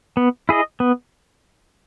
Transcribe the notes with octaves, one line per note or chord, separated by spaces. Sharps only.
B3
E4 G#4 D#5
B3